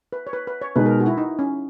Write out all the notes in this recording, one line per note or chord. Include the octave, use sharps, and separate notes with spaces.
B4
C#5
B4
B4
C#5
B2 G#3 D#4 B4
A#4
F#4
E4
D#4
C#4